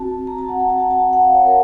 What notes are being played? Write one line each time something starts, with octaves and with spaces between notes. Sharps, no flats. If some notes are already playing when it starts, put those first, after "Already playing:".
Already playing: C4 F#4 A5
A#5
A5
F#5
A5
A5
F#5
A5
F#5
F5
C#5
A#4